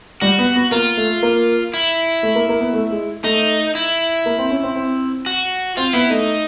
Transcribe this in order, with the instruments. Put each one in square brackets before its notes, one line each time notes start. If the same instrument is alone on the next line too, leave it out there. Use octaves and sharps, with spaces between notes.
[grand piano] G3 [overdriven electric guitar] F#4
[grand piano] B3
B3
[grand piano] A#3 [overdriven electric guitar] F4
[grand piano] A3
A#3
[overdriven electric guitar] E4
[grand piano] A3
A#3
A#3
B3
A3
G#3
[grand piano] A3 [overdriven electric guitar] D#4
[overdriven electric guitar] E4
[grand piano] A#3
C4
C#4
C4
C4
[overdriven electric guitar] F#4
[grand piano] C4 [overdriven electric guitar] F4
[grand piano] B3 [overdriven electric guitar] E4
[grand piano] A3 [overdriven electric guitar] D#4